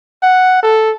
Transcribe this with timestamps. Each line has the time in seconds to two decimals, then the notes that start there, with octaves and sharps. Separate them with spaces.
0.23 F#5
0.63 A4